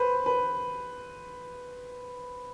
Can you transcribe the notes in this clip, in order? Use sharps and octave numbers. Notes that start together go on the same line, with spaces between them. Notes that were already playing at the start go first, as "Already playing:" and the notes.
Already playing: B4 C5
B4